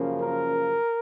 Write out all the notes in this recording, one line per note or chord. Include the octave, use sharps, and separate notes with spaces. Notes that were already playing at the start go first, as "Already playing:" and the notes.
Already playing: F#2 C#3 F3 A#3
A#4